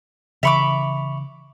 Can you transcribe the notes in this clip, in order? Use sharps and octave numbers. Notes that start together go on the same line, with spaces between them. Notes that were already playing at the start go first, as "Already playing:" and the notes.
C#3 E3 E5 B5 C#6 D6 C#7 F7